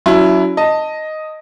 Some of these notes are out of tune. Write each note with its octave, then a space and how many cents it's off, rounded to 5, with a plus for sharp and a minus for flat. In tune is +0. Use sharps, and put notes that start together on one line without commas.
F#3 +0 C#4 +45 E4 +10
D#5 +0 A5 +20